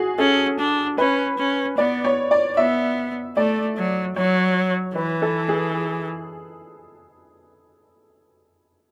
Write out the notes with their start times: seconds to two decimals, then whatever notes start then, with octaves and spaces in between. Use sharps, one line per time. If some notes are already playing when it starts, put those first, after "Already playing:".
Already playing: F#4 G#4
0.18 C#4 A4
0.59 D4
0.98 C#4 B4
1.38 C#4
1.77 B3 D5
2.05 C#5
2.31 D5
2.57 B3 E5
3.36 A3 D5
3.77 F#3
4.16 F#3 C#5
4.95 E3 B4
5.22 A4
5.49 G#4